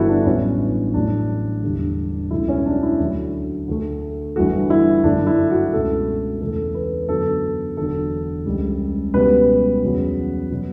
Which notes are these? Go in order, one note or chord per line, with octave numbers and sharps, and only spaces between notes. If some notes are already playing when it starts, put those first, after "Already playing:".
Already playing: G1 G2 E3 G3 B3 E4 F#4 A4
D4
A1 G2 F#3 B3 C#4
A1 A2 F#3 D4
E1 E2 D3 G3
C#2 B2 F#3 A3 E4
C#4
D4
E4
D2 D3 F#3 A3
D2 D3 A3
G1 G2 E3 A3 F#4
E4
G1 F#2 D3 A3 D4
E4
F#4
C#2 B2 A3 A4
E2 C#3 E3 A3 A4
B4
F#2 D3 F#3 B3 A4
E1 E2 D3 F#3 A4
C#2 C#3 G3
C#2 B2 G3 B3 B4
E2 C#3 F#3 B3
B2 F#3 B3